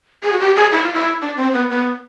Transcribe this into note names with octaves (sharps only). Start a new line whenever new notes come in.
G#4
F#4
G4
G#4
E4
F4
E4
D4
C4
B3
B3